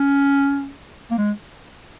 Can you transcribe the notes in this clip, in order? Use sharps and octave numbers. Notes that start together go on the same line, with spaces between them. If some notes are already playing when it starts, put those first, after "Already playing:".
Already playing: C#4
A#3
G#3